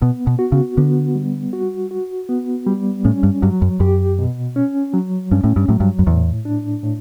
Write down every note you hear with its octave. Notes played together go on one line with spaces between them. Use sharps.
B2 B3
B2
F#4
C#3
D3 B3
G3
F#4
F#4
B3
G3
A2 C#4
G2
G2 F#3
F#2
F#2 G4
B2
C#4
F#3
G2 C#4
A2
G2
A2 F#3
G2
F#2
E2 A2
D4
A2